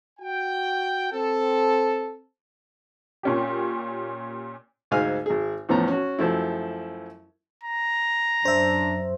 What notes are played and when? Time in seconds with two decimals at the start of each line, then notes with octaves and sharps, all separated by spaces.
0.20 F#4 G5
1.12 C4 A4
3.23 A#2 C#4 G4
4.91 D2 G#2 G#3 F5 G#5 F6
5.26 G#1 G#4
5.69 E2 A2 F3 B3 C#4 A#5
5.88 C#4 F#4
6.19 F#2 F3 A3 E4
7.64 A#5
8.45 F#2 D4 C5 E5